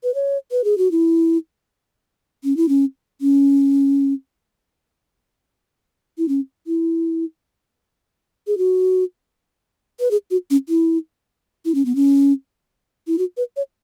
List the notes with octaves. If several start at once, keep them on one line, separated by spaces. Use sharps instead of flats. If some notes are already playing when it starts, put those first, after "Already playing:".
B4
C#5
B4
G#4
F#4
E4
C#4
E4
C#4
C#4
E4
C#4
E4
G#4
F#4
B4
G#4
F#4
C#4
E4
E4
C#4
B3
C#4
E4
F#4
B4
C#5